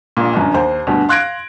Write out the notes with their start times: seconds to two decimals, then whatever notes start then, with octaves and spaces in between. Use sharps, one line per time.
0.17 A#1 A#2
0.33 G1 F#2
0.54 D#2 C5
0.87 D2 G2 B2
1.09 F5 C6 F#6 G#6 A#6 D7